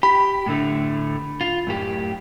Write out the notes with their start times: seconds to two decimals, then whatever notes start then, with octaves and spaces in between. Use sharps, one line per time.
0.03 G4 B5
0.46 A2 D3 A3
1.41 F4
1.67 F#2 A2 G4